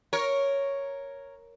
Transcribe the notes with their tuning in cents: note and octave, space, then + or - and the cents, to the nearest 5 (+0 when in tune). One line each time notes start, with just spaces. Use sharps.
A#4 +0 C#5 +0